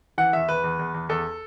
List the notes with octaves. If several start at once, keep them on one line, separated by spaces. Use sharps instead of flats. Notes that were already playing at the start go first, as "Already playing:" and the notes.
E3 F#5
E2 E5
E2 B4
E2
E2
E2
E2 A4